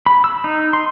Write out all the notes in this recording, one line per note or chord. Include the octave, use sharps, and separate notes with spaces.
B5
E6
D#4
C6